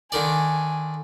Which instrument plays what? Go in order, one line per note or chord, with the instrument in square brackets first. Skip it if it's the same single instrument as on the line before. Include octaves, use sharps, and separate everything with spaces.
[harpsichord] D3 D#3 D5 [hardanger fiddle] G#5